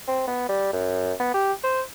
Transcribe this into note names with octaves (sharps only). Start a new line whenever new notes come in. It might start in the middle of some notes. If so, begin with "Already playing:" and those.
C4
B3
G3
F#2
B3
G4
C5